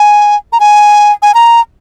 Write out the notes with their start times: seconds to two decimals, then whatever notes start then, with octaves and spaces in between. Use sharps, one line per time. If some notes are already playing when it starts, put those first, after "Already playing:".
Already playing: G#5
0.53 A#5
0.60 G#5
1.22 G#5
1.35 A#5